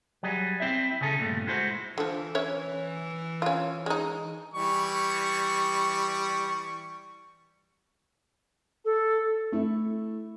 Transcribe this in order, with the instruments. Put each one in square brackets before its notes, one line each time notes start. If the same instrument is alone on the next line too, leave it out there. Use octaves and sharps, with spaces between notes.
[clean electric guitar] F#3 G3 G#4
C4 E4 E5
C#3 C#4 G#4 A4
G2 A#2 A3
G#3 E4 F#4 C5
[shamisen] D3 F3 [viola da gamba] E3
[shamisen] C#4 C#5 E5
C#4 F4
G#3 D#4
[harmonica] E3 G3 C#6
[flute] A4
[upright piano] A3 E4